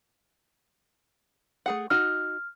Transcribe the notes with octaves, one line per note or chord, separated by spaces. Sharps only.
A3 G#4 F#5
D#4 F#4 F6